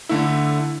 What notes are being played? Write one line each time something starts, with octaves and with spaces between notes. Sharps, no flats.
D3 A3 E4